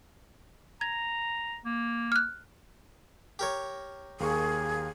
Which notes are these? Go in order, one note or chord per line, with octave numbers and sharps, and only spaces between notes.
A#5 G#6
A#3
F6 F#6
G4 A#4 C#5
D#2 A#3 G#4 C#6